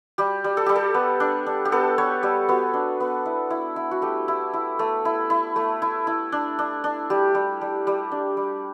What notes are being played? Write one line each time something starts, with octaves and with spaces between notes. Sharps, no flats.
G3 G4
G3
A4
G3 G4
A4
B3
D4
D4
G4
B3 A4
B3 C#5
G3 A4
B3 F#4
D4
B3
E4
E4
E4
F#4
A3 G4
E4
E4
A3
E4
E4
A3
E4
E4
D4
D4
D4
G3 G4
G3
G3
G3
D4
G3